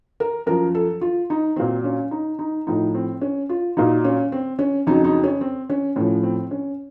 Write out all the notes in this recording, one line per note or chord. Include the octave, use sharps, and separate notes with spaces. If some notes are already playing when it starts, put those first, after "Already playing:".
A#4
F#2 F3 A#4
A4
F4
D#4
A#2 F#3 C4
C#4
D#4
D#4
A2 F3 D#4
C4
C#4
F4
A#2 F#3 D#4
C#4
C4
C#4
F2 C#3 F#3 D#4
D#4
C#4
C4
C#4
A2 F3 C#4
C4
C#4